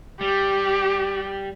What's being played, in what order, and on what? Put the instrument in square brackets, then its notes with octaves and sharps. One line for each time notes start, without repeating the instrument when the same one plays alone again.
[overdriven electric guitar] G3 [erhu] G4